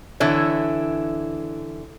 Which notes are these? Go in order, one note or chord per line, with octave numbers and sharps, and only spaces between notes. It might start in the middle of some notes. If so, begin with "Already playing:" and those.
D3 E3 E4 C#5